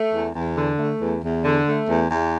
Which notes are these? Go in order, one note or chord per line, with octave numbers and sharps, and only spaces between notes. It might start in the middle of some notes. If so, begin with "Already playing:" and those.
Already playing: A3
E2
E2
D3
A3
E2
E2
D3
A3
E2
E2